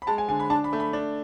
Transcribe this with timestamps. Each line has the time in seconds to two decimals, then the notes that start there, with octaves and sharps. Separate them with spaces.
0.02 B5
0.07 G#3 A5
0.18 G#5
0.28 D3 G#5
0.40 B5
0.50 D4 A5
0.64 B5
0.73 A3
0.80 B5
0.93 D4